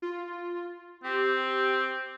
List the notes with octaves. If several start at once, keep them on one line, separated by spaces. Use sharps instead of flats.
F4
C4 G4